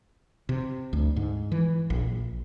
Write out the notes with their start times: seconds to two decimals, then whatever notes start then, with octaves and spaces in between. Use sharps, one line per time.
0.49 C3
0.93 D2
1.16 G#2
1.52 E3
1.90 A#1